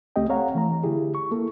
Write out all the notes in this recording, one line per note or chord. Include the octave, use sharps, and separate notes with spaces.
C#2 A3 C4 G4 D#5 G5
C4 A4 C#5 F5 F#5 A#5
E3 A3 A#5
D3 E4 G4 G#4
C#6
A#3 E4 A4